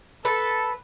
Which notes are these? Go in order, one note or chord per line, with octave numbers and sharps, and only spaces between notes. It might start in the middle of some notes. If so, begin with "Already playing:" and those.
A4 B4